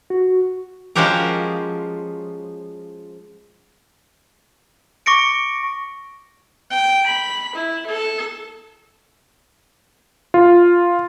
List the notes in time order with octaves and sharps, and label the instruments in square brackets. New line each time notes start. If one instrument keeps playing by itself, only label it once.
[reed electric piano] F#4
[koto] F3 G#3 C#4 F#4 G4 A#4
[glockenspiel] C#6 D6 A#6 C#7 D7
[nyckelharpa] G5
B5
E4
A4
[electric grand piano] F4